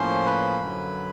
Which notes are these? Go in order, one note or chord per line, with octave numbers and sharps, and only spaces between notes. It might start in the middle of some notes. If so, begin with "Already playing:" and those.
Already playing: A2 F3 A#3 C#4 C5 C6
B4 B5
F#2 D3 F#3